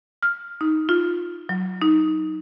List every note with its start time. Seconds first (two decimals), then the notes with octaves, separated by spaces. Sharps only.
0.23 F6
0.61 D#4
0.89 F4
1.49 F#3
1.81 D#4